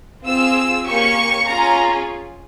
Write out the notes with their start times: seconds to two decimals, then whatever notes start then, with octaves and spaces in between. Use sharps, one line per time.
0.24 C4 F4 G#4 E6
0.86 A#3 C#4 G4 C#6
1.47 C#4 F4 G#4 A#5